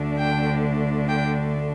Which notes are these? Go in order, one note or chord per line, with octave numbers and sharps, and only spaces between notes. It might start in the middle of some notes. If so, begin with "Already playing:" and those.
Already playing: D2 D3 A3 D4
G5
G5